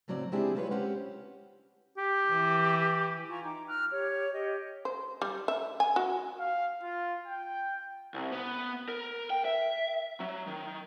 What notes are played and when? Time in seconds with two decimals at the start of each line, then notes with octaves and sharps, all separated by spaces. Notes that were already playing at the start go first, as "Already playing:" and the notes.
0.08 A2 C#3 F#3 C4 D5
0.32 G#3 C4 D4 E4 G4 G#4
0.55 G#3 E4 F4 A4 B4 C#5
0.71 C4 C#4 G4 B4 C5 F#5
1.98 G4
2.29 E3
3.29 F4 G#5 A#5 C#6
3.43 D#4 G5 D6
3.67 A#5 F6 F#6
3.91 G4 C#5
4.33 G4 D#5
4.85 C5
5.22 G3
5.48 E5
5.80 G#5
5.96 F#4
6.40 F5
6.83 F4
7.27 G5
8.14 C2
8.32 B3
8.88 A#4
9.30 G5
9.45 E5
10.20 F#3
10.47 D#3